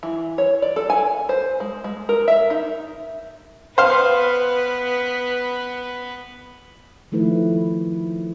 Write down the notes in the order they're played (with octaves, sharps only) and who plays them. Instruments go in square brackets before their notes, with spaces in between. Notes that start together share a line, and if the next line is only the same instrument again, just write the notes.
[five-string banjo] E3
C#5
D5
A4
G#5
C5
G#3
G#3
A#4
E5
D#4
[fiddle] B3 B4 [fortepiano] C5 F5
[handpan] D#3 F3 A3 E4 B4